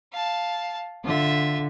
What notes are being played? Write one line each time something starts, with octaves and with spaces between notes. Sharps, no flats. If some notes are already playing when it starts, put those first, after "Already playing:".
F5 A5
D3 F4 E5